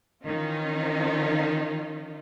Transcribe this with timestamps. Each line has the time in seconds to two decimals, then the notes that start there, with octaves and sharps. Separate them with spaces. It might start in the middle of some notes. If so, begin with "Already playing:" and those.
0.25 D#3 E3 C#4 D#4 F4